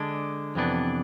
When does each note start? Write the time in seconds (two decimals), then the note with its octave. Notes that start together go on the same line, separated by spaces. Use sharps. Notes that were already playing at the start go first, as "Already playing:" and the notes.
Already playing: D3 G#3 D4
0.55 F2 C3 E3 B3 D4